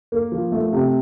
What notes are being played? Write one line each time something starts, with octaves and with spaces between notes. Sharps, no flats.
A#3
F3
A3
C3